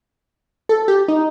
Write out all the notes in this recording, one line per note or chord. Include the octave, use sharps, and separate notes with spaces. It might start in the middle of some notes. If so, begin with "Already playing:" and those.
A4
G4
D#4